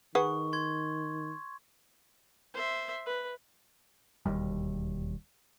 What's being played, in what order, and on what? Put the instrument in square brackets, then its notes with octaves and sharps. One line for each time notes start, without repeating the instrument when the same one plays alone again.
[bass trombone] D#3 [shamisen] G#4 B4 F#5 [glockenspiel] C#6
[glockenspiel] C6 G#6
[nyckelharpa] C5 E5
B4
[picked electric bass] E1 D#2 G3